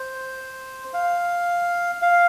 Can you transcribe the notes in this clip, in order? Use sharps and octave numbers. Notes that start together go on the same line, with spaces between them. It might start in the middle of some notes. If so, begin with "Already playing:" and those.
Already playing: C5
F5
F5